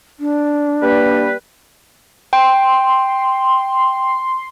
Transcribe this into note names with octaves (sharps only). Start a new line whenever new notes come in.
D4
G3 A#3 B4
G5 C6